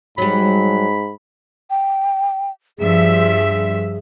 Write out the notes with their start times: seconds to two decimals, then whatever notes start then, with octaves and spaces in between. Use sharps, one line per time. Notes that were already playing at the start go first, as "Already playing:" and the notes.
0.18 G#2 F#3 G3 B5
1.70 G5
2.78 G2 F3 G#4 E5